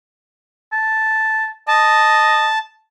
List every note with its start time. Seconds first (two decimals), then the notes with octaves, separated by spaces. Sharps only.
0.72 A5
1.68 D#5 A5